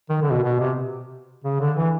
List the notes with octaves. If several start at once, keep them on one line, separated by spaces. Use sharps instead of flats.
D#3
D3
B2
B2
C3
C#3
D3
E3